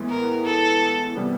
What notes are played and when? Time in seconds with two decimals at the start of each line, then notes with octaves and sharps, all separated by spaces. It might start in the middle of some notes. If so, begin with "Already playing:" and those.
Already playing: A2 E3 G#3 B3 E4
0.10 A#4
0.45 A4
1.16 C3 E3 G3 B3